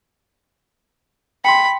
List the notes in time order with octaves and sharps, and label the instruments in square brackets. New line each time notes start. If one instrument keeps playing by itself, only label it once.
[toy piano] G5 C6 [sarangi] B5